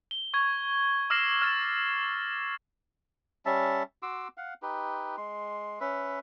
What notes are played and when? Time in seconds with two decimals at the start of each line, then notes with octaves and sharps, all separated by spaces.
0.11 G7
0.34 C#6 G#6
1.10 D6 E6 F6 A#6 C7 E7
1.42 F6 A6 E7
3.46 G3 C#4 E5 A5
4.03 F#4 C6 D6 E6
4.37 F5 F#5
4.62 D#4 G4 B4
5.17 G#3 C6
5.81 C#4 B4 E5